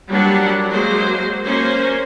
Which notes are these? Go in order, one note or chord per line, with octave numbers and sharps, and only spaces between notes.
F#3 G3 A#3 D4 F#5 A5
F#3 G#3 A#3 C5
A#3 C#4 C5